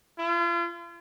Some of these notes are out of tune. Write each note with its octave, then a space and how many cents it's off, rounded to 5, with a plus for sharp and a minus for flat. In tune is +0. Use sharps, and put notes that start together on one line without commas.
F4 -40